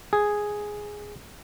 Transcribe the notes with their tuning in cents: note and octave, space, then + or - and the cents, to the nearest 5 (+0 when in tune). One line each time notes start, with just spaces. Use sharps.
G#4 +0